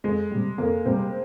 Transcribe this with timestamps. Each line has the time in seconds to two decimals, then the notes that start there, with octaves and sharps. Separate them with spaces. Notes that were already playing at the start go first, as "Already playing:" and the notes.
0.04 F2 G#3
0.31 C3 G3
0.58 F2 A#3
0.85 C3 G3 C4